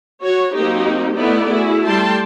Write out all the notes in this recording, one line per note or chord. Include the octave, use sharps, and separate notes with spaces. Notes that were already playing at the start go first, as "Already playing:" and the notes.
F#4 C#5
F#3 A#3 C4 D#4 G4
A3 B3 D#4 E4 B4 D5
E4 F#4 G#4
G3 A3 G5 A5 C6